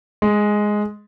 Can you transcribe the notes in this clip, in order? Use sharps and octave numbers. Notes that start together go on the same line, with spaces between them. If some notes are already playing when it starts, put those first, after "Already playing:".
G#3